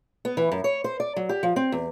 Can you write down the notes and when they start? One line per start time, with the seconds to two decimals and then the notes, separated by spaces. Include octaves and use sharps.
0.25 B3
0.37 E3
0.52 F#2
0.64 C#5
0.84 C5
1.00 D5
1.16 F#3
1.29 G4
1.43 F3
1.56 C4
1.72 E2